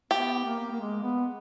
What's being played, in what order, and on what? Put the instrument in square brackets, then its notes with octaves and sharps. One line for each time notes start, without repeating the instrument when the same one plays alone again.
[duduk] B3 [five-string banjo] G4
[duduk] A#3
A#3
G#3
B3